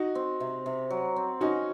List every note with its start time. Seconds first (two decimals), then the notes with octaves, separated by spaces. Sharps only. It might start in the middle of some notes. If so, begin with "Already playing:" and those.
Already playing: D#4 F#4
0.15 C4
0.40 C3
0.66 C3
0.90 F#3
1.16 C4
1.41 C#4 D#4 F#4